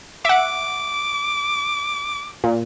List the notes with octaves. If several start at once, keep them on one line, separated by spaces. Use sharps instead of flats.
E5 F#5 D6
A#2